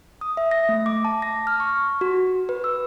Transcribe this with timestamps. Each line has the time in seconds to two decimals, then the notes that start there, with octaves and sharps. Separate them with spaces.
0.21 D#6
0.37 E5
0.51 A#6
0.69 A3
0.86 D6
1.05 A5
1.22 A#6
1.47 F6
1.60 C#6
2.01 F#4
2.49 B4
2.64 E6